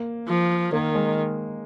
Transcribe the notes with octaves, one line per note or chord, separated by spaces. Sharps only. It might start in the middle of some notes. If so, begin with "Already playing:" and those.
Already playing: A#3
F3
D#3 A#3
G#3